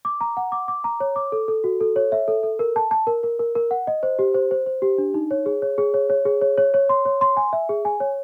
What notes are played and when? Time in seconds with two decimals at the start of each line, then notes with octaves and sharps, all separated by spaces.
0.05 D6
0.21 A#5
0.37 F#5
0.52 D6
0.68 D6
0.84 A#5
1.00 C#5
1.16 D6
1.32 A4
1.48 A4
1.64 F#4
1.80 A4
1.96 C#5
2.12 E5
2.28 A4
2.43 A4
2.59 A#4
2.76 A5
2.91 A5
3.07 A#4
3.23 A#4
3.39 A#4
3.55 A#4
3.71 F#5
3.87 D#5
4.03 C5
4.19 G4
4.34 C5
4.51 C5
4.66 C5
4.82 G4
4.98 D4
5.14 D#4
5.31 C#5
5.46 G#4
5.62 C#5
5.78 G#4
5.94 C#5
6.10 C#5
6.25 G#4
6.41 C#5
6.58 C#5
6.74 C#5
6.89 C6
7.05 C#5
7.21 C6
7.37 G#5
7.53 E5
7.69 G#4
7.85 G#5
8.00 C#5